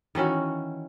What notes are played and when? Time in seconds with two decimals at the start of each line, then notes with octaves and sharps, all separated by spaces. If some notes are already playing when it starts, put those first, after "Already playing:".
0.15 D#3 E3 C#4 F#4